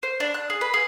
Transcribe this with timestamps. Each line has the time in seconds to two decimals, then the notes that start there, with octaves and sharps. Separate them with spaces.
0.03 C5
0.20 D4
0.34 F#6
0.50 G#4
0.61 B4
0.74 G#4